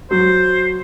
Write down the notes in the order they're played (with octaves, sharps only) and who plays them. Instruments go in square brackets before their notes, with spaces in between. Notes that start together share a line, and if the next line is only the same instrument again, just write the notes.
[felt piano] F#3 [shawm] C5